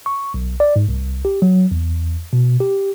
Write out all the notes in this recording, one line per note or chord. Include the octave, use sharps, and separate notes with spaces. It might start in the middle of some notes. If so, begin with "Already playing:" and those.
C#6
B1
D5
G#2
C2
G4
F#3
E2
B2
G4